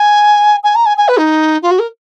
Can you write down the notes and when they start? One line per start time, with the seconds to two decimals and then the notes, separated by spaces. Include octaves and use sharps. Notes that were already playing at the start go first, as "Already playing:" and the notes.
Already playing: G#5
0.63 G#5
0.75 A#5
0.86 G#5
0.97 G#5
1.08 B4
1.18 D#4
1.62 F4
1.71 F#4
1.79 A#4